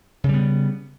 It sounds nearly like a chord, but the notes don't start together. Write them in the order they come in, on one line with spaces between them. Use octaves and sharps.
C#3 G3 B3